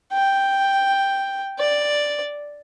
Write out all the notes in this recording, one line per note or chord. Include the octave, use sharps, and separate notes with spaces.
G5
D5